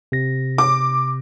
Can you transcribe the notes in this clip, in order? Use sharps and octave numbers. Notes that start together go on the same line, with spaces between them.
C3 A#6
D6